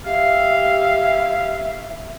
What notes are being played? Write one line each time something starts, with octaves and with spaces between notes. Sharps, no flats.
G4 E5 F5